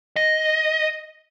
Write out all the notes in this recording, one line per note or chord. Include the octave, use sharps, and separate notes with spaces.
D#5